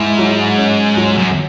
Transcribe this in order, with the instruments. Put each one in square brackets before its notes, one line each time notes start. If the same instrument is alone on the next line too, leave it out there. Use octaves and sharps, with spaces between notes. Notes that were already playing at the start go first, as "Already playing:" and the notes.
Already playing: [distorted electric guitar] G#2 [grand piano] E4
[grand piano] F#3
C#4
F#3
[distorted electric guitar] F#2